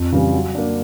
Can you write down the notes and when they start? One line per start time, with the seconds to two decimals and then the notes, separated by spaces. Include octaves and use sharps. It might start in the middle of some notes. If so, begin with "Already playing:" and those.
Already playing: F2
0.12 C#3 E3 G3
0.33 F#3
0.55 A#3 D4